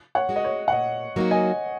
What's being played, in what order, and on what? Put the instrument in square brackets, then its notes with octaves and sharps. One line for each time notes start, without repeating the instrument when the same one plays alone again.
[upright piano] C#5 F#5
[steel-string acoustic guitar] G#3 F#4
[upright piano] D#5
C#5
F#5
[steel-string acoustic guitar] A#2 [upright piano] D#5
[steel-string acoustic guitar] F#3 A#3 D#4 F#4
[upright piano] D#5 G#5